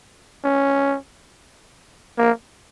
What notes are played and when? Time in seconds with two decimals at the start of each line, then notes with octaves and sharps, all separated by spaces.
0.44 C#4
2.18 A#3